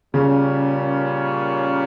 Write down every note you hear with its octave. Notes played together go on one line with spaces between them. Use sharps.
A#2 C#3 G3 A#3 C#4